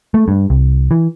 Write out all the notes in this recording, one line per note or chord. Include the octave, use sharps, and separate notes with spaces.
A3
G2
C2
E3